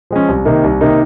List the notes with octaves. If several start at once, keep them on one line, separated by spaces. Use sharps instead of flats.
F3 G#3 C#4
C2
C3 D#3 A#3 D#4
C2
C3 D#3 A#3 D#4